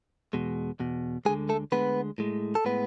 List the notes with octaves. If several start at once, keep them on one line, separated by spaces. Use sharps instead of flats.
E2 B2 G#3
E2 B2
D2 D3 G#3 G#4 G#5
A3 A4
D2 D3 G#3 B3 B4
A2 G#3
A4
A2 G#3 B3 B4